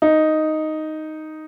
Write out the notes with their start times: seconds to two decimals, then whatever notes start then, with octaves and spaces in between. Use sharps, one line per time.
0.02 D#4